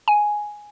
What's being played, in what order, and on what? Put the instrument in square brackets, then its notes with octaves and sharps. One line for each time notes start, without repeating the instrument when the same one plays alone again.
[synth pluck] G#5